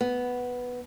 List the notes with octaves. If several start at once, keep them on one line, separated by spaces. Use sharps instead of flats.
B3